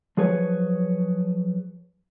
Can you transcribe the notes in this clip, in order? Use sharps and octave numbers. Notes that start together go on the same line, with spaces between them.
F3 F#3 G#4 B4 C#5